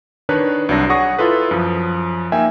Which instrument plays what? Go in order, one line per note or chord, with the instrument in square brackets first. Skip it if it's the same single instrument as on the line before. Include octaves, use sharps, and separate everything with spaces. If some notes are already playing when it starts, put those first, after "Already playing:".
[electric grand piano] D#3 D4 D#4 B4 C#5 F#6
C2 F#3 D4 A#6
G#4 C#5 F#5 C#6 D#6 A#6
E4 F4 A4 B4
F#2 F3
A#3 D#4 E5 G5 G#5